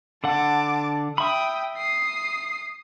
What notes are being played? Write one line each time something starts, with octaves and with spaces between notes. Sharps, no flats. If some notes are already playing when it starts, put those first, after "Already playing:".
D3 F#5 A5 D6
E5 G5 B5 D#6
D#6 C7